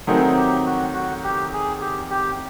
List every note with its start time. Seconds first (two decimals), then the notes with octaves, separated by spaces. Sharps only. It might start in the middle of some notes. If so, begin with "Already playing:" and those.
0.07 D#3 F#3 A3 C4 D#4 G#4
0.37 G4
0.66 F#4
0.94 F#4
1.24 G4
1.53 G#4
1.81 G4
2.10 G4